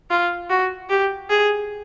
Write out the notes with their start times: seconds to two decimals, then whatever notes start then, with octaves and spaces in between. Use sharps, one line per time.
0.10 F4
0.49 F#4
0.89 G4
1.30 G#4